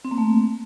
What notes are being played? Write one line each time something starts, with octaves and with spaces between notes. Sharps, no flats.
C4
A#3
A3